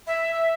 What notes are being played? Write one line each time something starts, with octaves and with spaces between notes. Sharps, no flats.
E5